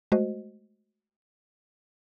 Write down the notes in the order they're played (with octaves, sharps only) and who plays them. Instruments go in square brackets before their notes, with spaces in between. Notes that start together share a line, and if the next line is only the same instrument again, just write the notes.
[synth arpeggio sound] G#3 A3 F#4 C5 D#5